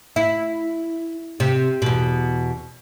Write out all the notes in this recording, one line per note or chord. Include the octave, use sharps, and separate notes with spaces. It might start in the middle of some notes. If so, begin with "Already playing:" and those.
E4
C3
E2 B2